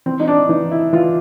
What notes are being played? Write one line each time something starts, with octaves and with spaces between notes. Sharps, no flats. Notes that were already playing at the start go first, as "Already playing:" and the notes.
E3 C4
D#4
D4
E3 D#4
E4
E3 F4